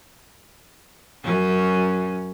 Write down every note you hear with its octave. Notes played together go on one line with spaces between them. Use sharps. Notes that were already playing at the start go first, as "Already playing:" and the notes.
F#2 C#4